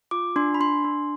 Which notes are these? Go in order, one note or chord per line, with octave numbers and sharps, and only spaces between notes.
F4 D6
D4 C6
B5
D4 C6
D4